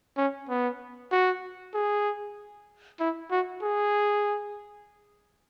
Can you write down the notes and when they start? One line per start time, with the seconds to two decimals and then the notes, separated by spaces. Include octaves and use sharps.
0.17 C#4
0.49 B3
1.12 F#4
1.74 G#4
3.00 E4
3.31 F#4
3.62 G#4